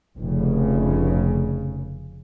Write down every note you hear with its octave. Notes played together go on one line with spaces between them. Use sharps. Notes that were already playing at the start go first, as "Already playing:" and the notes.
F1 C#3